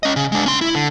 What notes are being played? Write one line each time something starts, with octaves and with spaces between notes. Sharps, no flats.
C#4 D#5
C#3
G#3 D4
C#4 C6
E4
D3